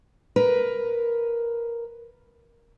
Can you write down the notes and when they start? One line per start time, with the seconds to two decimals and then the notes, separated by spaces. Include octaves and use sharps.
0.36 A#4 B4